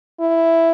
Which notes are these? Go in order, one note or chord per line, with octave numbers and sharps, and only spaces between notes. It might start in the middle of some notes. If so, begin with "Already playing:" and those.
E4